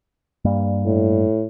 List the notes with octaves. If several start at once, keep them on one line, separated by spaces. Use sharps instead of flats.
G2 G3 A#3
A2